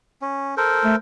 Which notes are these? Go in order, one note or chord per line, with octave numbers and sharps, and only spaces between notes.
C#4
A4 A#4 C5
A3